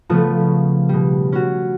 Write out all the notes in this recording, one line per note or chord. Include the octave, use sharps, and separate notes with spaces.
C#3 F3 A3 B3 F4
C#4
B2 G3
C#4 F#4